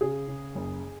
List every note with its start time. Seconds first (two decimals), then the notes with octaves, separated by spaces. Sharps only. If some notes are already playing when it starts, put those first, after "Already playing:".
0.01 C#3 G#4
0.28 C#3
0.55 F#1